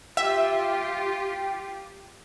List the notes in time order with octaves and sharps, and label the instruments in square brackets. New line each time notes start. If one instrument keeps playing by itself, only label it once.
[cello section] F4 G4 [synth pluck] E5 [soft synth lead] G5